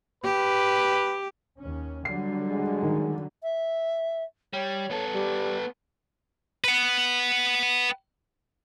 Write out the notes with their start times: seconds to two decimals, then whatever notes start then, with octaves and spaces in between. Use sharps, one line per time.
0.24 G4 B4
1.61 D#2 C#4
2.05 D3 F#3 G3 C7
2.50 G#3
2.83 D#3
3.43 E5
4.53 G3 C#5
4.91 B3 A4
5.13 G3
6.64 B4 F#5